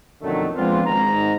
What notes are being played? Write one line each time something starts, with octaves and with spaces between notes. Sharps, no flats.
B1 F2 D3 D#3 F#3 A3
F3 G#3 B3 C4 D4 F4
G#1 G#2 A#5